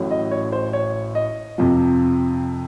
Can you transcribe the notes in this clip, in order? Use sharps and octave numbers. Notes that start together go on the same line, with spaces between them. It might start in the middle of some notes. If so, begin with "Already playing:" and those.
Already playing: A1 A2 F#3
D#5
C#5
C5
C#5
D#5
F2 C3 F3